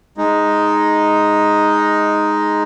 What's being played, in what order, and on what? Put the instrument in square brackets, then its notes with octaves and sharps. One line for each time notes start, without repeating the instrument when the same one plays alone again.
[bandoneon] G#3 D#4